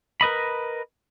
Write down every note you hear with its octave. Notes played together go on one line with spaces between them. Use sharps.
A#4 B4 D#5 B5